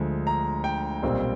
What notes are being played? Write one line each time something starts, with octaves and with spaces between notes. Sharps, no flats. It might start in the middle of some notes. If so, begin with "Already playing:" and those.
Already playing: D2 D3 F3 G#3
A#5
G5
B1 A#2 G3 C4